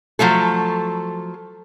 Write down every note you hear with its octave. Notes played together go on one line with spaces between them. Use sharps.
F3 F#3 A3 A4